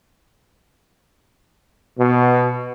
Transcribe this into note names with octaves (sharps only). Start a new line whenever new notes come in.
B2